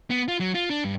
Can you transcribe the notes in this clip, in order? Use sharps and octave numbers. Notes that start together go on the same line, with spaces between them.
B3
F4
F#3
F4
D4
G2